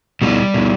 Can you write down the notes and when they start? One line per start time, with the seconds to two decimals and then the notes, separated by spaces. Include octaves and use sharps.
0.22 B2 G3
0.54 B2